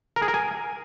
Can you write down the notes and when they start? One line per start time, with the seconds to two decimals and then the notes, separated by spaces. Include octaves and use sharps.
0.16 A#4
0.22 G#4
0.28 A#4
0.34 G#5